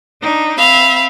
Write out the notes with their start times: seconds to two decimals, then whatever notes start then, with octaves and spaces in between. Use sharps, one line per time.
0.20 D4 D#4
0.56 C4 E5 F5 B5